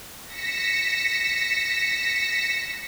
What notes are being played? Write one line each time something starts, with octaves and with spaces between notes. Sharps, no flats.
A#6 B6 C#7 E7